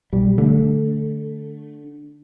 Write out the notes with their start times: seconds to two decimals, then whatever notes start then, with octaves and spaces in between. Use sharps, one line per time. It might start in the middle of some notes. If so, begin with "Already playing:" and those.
0.13 B1 G3
0.38 D3 A3